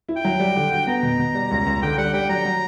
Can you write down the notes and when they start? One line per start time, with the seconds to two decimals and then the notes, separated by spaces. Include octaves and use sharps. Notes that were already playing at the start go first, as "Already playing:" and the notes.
0.08 E4
0.16 G5
0.25 F#3
0.40 G3
0.56 D3
0.72 F#4
0.87 B3 A#5
1.03 B2
1.19 B2
1.35 G3
1.51 C#2
1.66 C#2
1.82 D3 G5
1.98 G3 F#5
2.13 G3 G5
2.29 F#3 A#5
2.45 F#3